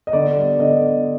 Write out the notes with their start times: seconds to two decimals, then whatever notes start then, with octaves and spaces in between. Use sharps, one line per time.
0.07 D#5
0.13 D3 D5
0.36 G3 B3
0.59 D3 D#5